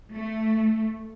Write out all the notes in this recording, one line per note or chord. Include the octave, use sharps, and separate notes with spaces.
A3